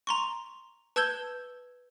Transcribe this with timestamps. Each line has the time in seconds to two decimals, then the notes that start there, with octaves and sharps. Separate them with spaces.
0.07 A#5 C6 C#6
0.96 B4 A5 E6 G6 G#6 G7